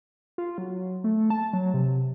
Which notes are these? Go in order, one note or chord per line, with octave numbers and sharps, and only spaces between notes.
F4
F#3
A3
A5
F#3
C3